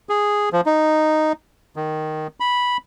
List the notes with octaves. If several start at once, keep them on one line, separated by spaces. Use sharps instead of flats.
G#4
F3
D#4
D#3
B5